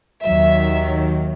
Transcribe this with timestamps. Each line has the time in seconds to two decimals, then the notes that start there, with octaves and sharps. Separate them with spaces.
0.23 D#2 D#3 F#3 E5